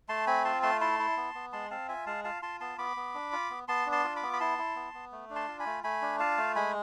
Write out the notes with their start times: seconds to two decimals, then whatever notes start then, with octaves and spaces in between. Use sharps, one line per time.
0.09 A3 A5 C6
0.27 C4 G#5 B5
0.45 F4 A5 C6
0.63 A3 A5 C6
0.81 E4 A5 C6
0.99 E4
1.17 B3
1.35 B3
1.53 G#3 A5 C6
1.71 C4 F5 A5
1.89 F4 E5 G#5
2.06 G#3 F5 A5
2.24 F4 F5 A5
2.42 F4 A5 C6
2.60 B3 A5 C6
2.78 B3 B5 D6
2.97 B3
3.14 D4
3.32 F4
3.50 B3
3.68 B3 A5 C6
3.86 D4
3.92 A5 C6
4.04 F4
4.16 B5 D6
4.22 B3
4.33 B5
4.40 E4 A5 C6
4.58 E4
4.76 B3
4.94 B3
5.12 A3
5.30 D4
5.36 A5 C6
5.48 F4
5.60 G#5 B5
5.66 A3
5.84 A3 G#5 B5
6.02 D4
6.20 F4 F5 A5
6.38 A3
6.56 G#3 G#5 B5